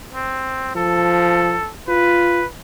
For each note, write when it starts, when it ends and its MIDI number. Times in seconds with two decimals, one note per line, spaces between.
0.15 0.75 60
0.76 1.58 53
0.76 1.70 69
1.88 2.42 65
1.88 2.46 71